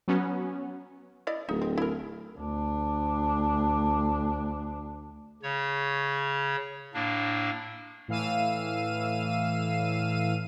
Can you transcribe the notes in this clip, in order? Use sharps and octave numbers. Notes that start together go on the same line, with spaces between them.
F#3 B3 C#4
E4 D5 D#5
D1 D#4
C4
E4 A#4
D2 D4
C#3 C#5
A2 A#3 D4
A2 E3 F5 E6 D#7